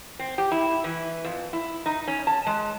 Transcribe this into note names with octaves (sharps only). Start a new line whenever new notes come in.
C4
G4
E4
E3
F2
E4
D#4
C#4
A5
G#3